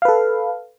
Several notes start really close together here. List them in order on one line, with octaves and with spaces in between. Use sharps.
F5 B4 A4